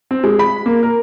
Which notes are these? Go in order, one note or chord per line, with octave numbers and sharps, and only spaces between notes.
C4
G#3
B5
A#3
A#4